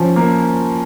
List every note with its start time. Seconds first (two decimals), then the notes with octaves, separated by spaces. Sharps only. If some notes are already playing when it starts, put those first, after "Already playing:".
Already playing: F3 C#4
0.16 A#3